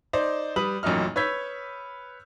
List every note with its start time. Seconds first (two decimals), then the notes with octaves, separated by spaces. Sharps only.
0.13 D#4 C5 D5
0.56 G3 B4 D#6 F#7
0.83 A1 F#2 A#2 F#3 D#4 F6
1.16 B4 C#5 E6 G6 G#6 B6